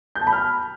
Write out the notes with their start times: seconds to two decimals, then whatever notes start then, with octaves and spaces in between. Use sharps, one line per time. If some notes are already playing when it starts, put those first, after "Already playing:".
0.15 G6
0.21 A5
0.27 B5
0.33 F6